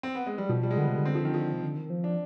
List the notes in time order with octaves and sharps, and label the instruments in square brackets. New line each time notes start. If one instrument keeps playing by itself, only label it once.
[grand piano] C4
B3
G#3
G3
[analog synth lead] B2 [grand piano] F3
[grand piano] G3
G#3
[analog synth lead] D3 [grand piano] B3
[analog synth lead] C3
D3
[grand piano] C4
F3
D#3
F3
[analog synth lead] C3
D3
D#3
F3
[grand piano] D4